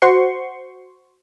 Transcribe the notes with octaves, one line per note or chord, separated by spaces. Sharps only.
F#4 C5 C6 C#6